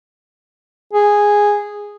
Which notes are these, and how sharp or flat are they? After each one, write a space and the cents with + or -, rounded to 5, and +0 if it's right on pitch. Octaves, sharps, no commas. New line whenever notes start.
G#4 -5